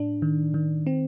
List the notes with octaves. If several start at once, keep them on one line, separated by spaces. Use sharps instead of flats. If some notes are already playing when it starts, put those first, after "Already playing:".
Already playing: A2 D4
D#3
D#3
C4